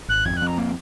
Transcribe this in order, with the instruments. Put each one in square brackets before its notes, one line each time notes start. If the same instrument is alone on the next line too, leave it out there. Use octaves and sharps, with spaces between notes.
[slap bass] G#1 [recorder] F#6
[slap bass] F2 [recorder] G#6
[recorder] F#6
[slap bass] F2 [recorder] A#5
[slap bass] A#3